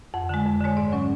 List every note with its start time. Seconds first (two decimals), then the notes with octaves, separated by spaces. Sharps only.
0.14 F2 F#5
0.29 D3 G#3
0.45 F2
0.61 D3 G#3 C#5
0.77 G#2 D5
0.92 F#3 C#4